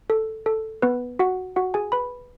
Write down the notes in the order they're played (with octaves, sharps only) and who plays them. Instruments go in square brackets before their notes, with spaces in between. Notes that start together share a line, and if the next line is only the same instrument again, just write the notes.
[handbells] A4
A4
B3 B4
F#4 F#5
F#4 F#5
G#4 G#5
B4 B5